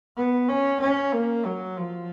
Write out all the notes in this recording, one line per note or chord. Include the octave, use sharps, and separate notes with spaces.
B3
C#4
C#4
A#3
F#3
F3